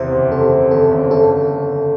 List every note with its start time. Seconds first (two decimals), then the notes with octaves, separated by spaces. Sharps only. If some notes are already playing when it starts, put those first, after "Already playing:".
Already playing: E2 C3 E3 C5 E5
0.12 F#1
0.32 C3 A4
0.52 C3
0.71 F#1 A4
0.92 F#1
1.11 G1 A4